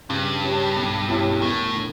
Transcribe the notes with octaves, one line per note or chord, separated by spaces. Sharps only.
G2 C#3
G3 C#4
B1
B2 G3 C#4 E4
E1 A2
D3